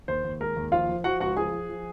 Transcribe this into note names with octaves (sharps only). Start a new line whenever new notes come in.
D#2 C5
D#2
G#3 A#4
D#2
F3 F4 F5
F3
F3 F#4 F#5
C#2 F#4 F#5
F3 G#4 G#5
F3
F3